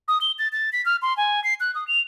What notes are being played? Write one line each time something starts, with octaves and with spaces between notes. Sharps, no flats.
D#6
G7
A6
A6
B6
F6
C6
G#5
C7
F#6
D#6
F7